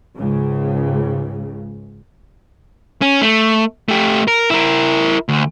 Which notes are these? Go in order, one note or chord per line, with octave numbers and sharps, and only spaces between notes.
C#2 G#2 C#3
C#4
A3
A3 G4
A#4
E4 A#4
D2